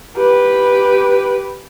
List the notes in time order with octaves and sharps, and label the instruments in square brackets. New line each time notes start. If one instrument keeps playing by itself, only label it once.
[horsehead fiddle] G4 B4